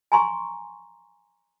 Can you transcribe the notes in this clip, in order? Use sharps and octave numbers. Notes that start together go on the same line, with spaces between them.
G#5 A#5 C6 C#6